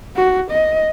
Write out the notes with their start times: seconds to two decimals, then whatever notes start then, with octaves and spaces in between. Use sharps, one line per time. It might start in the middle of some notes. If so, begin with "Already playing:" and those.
0.16 F#4
0.51 D#5